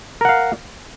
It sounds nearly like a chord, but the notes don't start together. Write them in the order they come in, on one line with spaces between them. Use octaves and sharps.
A#4 F#5 F5